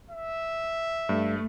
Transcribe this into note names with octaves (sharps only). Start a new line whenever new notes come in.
E5
G2 A3